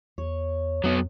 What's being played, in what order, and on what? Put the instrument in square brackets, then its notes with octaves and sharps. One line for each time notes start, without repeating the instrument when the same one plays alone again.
[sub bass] E2 [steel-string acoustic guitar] C#5
[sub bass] F2 [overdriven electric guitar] F#3 B3